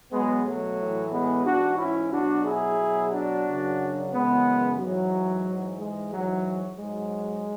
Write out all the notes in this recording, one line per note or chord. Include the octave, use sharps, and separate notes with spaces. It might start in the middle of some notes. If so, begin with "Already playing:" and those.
B2 F#3 G#3 B3
F#3 A3
A2 E3
G#3 B3
G#2 E3 D4 F#4
C#4 E4
B2 F#3 D4 F#4
E4 G#4
B2 F#3
D4 F#4
F#2 C#3 F#3
F#2 C#3 E3 G#3 B3
G#2 E3 F#3
G#2 E3
G#3
G#2 E3 F#3
G#2 F#3 G#3